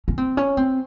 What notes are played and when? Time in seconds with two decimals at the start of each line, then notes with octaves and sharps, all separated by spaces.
0.08 C#4
0.18 C4
0.37 C#4
0.57 C4